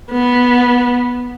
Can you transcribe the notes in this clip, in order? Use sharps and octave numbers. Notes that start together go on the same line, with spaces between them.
B3